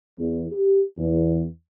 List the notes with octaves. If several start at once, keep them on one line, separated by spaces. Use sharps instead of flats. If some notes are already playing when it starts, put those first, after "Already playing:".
E2
G4
E2